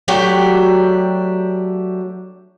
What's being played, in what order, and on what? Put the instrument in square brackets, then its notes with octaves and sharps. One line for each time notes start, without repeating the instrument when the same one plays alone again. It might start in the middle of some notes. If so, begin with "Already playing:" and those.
[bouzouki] F#3 A3 D4 G4